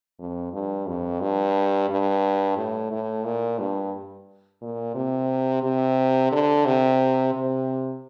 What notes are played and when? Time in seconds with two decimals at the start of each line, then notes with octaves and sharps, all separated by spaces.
0.19 F2
0.53 G2
0.87 F2
1.21 G2
1.89 G2
2.57 A2
2.91 A2
3.25 A#2
3.59 G2
4.61 A#2
4.95 C3
5.63 C3
6.32 D3
6.65 C3
7.33 C3